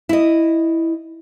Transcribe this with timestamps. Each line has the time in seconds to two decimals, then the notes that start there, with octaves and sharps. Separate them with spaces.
0.09 E4 D#5